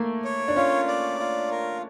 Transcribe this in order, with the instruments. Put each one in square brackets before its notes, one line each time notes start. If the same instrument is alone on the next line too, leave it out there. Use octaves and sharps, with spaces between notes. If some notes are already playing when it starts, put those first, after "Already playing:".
Already playing: [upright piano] A3 A#3
[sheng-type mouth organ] C#5
[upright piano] D4
[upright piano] C#4 [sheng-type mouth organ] F4
[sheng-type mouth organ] D5
F4
A#4